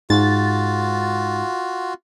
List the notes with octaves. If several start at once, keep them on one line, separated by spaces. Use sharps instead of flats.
G#2 F4 F#4 A6